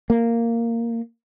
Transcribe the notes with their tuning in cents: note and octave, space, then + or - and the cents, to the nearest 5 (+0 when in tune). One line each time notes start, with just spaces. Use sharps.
A#3 -10